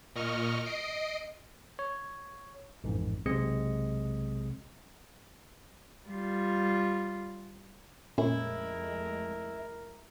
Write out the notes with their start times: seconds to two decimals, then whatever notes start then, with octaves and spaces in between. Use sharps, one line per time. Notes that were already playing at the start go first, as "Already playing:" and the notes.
0.15 A#2 D#5 C#6 F6
0.65 D#5 C7 D7
1.79 C#5
2.84 A1 F2 G#2
3.26 B1 C3 G#3 C4 D#5 C#7
6.09 G3 F4
8.18 F2 A#2 G#3 A3 C#4 E4 A#4